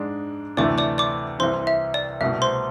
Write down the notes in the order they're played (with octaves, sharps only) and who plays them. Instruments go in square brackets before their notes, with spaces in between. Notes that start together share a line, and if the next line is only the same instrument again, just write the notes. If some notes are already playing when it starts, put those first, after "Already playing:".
Already playing: [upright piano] G#2 G#3 D4
[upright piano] D2 C3 E3 A3 [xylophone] D5 D6
[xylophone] D5 D6
D5 D6
[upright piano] C2 C3 E3 [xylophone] C5 C6
[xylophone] E5
D5
[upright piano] C2 B2 A3 [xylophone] E5
[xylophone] C5 C6